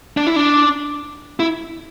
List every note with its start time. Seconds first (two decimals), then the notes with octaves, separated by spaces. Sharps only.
0.17 D4
0.27 E4
0.36 D4
1.40 E4